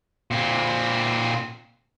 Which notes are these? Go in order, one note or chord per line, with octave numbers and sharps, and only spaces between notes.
A#2 C4